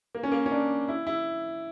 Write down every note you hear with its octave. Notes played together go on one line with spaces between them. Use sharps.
A#3
C#4
A#3
C#4
D4
E4
E4